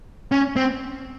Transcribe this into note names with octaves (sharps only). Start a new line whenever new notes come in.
C#4
C4